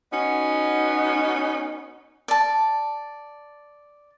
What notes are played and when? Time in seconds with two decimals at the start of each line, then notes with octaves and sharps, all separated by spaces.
0.12 B3 C#4 D#4 F#4
2.28 D5 A5